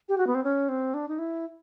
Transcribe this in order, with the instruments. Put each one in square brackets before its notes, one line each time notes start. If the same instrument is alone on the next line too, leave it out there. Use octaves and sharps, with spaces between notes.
[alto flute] G4
F#4
B3
C4
C#4
C4
D4
D#4
E4